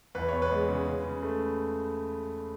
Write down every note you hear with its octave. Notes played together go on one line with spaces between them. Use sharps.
E2 B4
B3 C#5
B4
G#3
C#3
C#3
C#3
A3